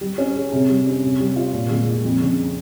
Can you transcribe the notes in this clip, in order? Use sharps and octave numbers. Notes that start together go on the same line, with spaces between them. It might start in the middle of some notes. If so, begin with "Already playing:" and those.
G3
C#4
G#4
C3
G3
C#4
C3
G3
F4
A#2
G#3
F4
F2
C#3